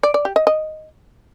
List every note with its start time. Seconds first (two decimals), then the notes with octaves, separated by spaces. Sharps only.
0.03 D5
0.14 D5
0.25 G4
0.36 D#5
0.47 D#5